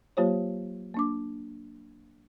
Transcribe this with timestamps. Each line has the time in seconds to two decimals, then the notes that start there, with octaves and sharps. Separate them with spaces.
0.17 F#3 A#3 F4 G4 C5 C#5
0.94 A#3 D4 D6